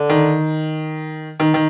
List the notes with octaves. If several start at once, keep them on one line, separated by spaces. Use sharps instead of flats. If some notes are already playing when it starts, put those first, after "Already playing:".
Already playing: D3
D#3
D#3
D#3